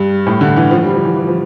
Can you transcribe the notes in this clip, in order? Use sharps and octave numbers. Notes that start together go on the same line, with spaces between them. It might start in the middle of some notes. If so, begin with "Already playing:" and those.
Already playing: G2
A2
D3
E3
F3
G3
F3
E3
E3
F3